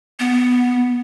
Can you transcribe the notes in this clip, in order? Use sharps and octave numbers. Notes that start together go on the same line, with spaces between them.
B3